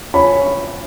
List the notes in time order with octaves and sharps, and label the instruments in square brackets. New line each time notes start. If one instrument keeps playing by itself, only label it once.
[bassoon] C#4 [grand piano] B5